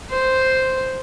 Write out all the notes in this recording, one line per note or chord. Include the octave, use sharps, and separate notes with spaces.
C5